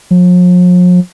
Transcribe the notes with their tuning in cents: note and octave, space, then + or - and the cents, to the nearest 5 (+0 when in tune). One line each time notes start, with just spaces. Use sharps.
F3 +45